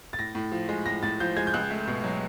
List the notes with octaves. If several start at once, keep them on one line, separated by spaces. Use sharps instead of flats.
A6
A2 A#6
A2
F3
G#3
A2 A#6
A2 A6
F3 G6
G#3 G#6
G6
C#2 F#6
A3
B2
F#3